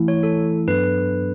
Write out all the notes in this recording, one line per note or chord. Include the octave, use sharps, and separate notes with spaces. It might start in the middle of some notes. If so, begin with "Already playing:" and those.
Already playing: E3 A3 E4
C#5
A4
G2 F#3 B3 D4 A4 B4